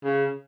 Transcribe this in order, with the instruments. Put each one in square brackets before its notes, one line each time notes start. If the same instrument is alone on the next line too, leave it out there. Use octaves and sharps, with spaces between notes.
[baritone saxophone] C#3